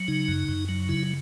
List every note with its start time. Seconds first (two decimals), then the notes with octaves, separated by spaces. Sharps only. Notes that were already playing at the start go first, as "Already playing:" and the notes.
Already playing: F#3
0.08 C#3 D#4
0.28 F#2
0.48 F#2
0.69 F#3
0.89 C#3 E4